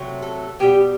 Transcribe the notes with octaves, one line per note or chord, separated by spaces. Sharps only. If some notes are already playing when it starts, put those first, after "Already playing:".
Already playing: C3 F#3 A3
A4
B2 G3 G4